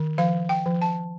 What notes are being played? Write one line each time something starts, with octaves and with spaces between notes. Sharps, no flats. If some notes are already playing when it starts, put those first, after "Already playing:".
Already playing: D#3
F3 F5
G5
F3
A5